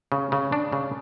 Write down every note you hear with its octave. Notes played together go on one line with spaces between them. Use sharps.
C#3
C#3
D4
C#3